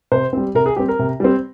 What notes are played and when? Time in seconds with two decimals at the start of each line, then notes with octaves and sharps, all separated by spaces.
0.12 C3 C5
0.33 G3 C4
0.55 C3 A#4
0.66 G#4
0.76 G3 C4 G4
0.88 A#4
0.99 C3
1.20 G3 C4